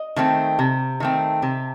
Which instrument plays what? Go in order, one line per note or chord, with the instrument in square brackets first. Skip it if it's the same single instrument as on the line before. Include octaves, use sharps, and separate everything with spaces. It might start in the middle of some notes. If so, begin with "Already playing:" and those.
Already playing: [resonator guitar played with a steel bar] D#5
D#3 A3 C4
C3
D#3 A3 C4
C3